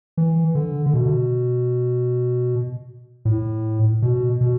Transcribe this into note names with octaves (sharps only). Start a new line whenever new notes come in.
E3
D3
D3
B2
A2
B2
B2